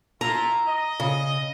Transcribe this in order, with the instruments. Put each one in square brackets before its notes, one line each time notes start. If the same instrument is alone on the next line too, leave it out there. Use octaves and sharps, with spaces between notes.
[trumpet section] E4 F4 [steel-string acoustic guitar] A#5
[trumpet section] D#5
[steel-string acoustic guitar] C#3